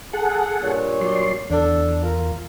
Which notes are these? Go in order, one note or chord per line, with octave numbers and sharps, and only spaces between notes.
G#4 A4 F#5
G2 A#2 C#5
F#3 D5 C6
E2 D3 D4 A4
F4 A#4